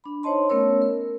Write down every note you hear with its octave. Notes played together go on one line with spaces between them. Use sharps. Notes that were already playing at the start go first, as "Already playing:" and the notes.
D4 B5
D#4 C5 C#5 D#5 A5 C6
A3 B3 C#4 A#4 C#5 E6
A#4